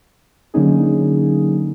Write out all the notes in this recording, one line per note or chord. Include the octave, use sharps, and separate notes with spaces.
D3 F#3 A#3 C#4 D#4 G#4